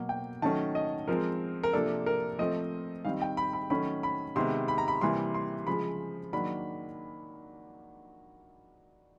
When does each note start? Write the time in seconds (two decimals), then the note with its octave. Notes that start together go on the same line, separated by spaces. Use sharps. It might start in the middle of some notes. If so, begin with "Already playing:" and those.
Already playing: B2 F#3 A#3
0.09 G5
0.42 D#3 F#3 A3 C#4 A5
0.75 D#5
1.08 F3 G#3 C4 A#4
1.63 A#4
1.73 C3 F3 A#3 D4 A4
2.06 A#4
2.39 F3 A3 C4 D#5
3.05 D#3 G3 C4 F5
3.22 G5
3.37 B5
3.53 B5
3.70 D#3 F#3 A3 C#4 B5
4.03 B5
4.36 C3 D#3 G#3 B3 C6
4.68 B5
4.78 A#5
4.88 B5
5.01 C3 E3 G3 A#3 C6
5.34 C6
5.67 C#3 F3 G#3 B5
6.33 D#3 F#3 A#3 D4 B5